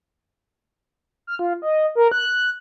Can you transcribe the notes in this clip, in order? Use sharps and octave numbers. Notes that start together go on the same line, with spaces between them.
F6
F4
D#5
A#4
F#6